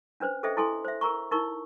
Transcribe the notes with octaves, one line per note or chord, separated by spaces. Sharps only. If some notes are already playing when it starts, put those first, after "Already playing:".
C#4 D4 B4 C5
G#4 A4 C5 D#5 E5 G5
E4 G#4 A4 G#5 C6
C5 E5
G#4 A#4 A#5 C#6
D#4 E4 A#4 C#6